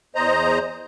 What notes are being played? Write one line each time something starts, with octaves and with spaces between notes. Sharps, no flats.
E2 C5 D#5 A#5